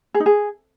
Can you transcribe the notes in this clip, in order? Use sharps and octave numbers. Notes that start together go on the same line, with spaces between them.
G#4
D#4
G#4